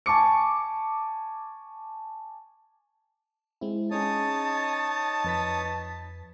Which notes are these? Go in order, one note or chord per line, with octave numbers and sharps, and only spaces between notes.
G#5 A5 C#6 D6 C#7
G#3 C4 E4
C#4 D#4 G#4 C#5 A5 D#6
F2 B4 B6